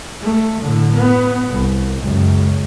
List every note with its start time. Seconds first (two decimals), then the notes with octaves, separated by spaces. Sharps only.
0.21 A3
0.62 A2 D3
0.93 B3
1.50 C2
2.02 C#2 F#2